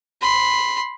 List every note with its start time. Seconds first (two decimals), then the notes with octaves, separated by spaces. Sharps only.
0.21 B5 C6